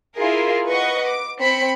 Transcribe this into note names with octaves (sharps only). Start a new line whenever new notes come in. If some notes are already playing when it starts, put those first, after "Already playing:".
E4 F4 G#4 A#4
B4 D#5 F#5 C#6
D6
C4 B5 C#7